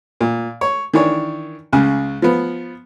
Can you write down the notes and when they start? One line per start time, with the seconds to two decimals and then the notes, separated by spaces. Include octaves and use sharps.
0.21 A#2
0.61 C#5
0.94 D#3 E3 D4 C#5
1.73 C#2 C#3
2.22 F3 B3